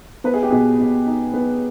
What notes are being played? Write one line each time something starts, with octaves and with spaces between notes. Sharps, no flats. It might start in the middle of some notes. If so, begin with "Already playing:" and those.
B3 B4
G#4
G4
B2 G#4
B2
D#4
B3